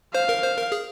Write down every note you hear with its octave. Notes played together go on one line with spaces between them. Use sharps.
C5 F5
A#4
C5
A#4
G#4